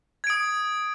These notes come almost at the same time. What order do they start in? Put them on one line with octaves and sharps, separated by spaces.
G#6 D7 D#6